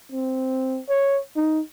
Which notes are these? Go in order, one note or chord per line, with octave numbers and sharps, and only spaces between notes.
C4
C#5
D#4